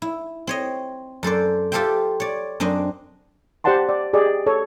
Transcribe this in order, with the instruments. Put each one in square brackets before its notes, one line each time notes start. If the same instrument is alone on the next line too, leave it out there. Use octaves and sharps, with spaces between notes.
[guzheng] E4
C4 C#5 D#5
F#2 A4 C5 D5
F4 G4 A4 C5 E5 G5
C#5 D5
F#2 C4 D4 D#5
[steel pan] G4 C5 D5 F#5 A5 C6
D5
G4 G#4 D5 D#5
A4 C#5